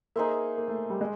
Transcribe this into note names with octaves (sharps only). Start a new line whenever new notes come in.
A#3 D#4 G#4 C5 E5
A#3
A3
G3
G#3